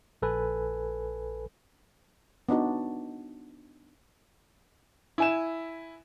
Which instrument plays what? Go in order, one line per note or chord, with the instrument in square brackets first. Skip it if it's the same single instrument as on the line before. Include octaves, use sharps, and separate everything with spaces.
[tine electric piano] A#1 A4 B4 G#5
[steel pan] B3 D4 D#4 F#4
[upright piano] E4 G#5 E7